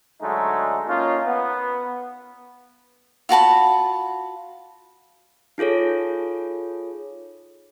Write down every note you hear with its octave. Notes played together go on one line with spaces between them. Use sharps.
D3 F#3 G#3 A3 D#4
A#3 C#4 D#4 F4
B3
F4 F#4 A5 B5
D#4 F4 G#4 A4 C#5